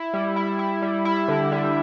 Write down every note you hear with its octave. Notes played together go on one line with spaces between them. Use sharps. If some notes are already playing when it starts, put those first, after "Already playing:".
Already playing: E4
G3
E4
E4
G3
E4
D3
G3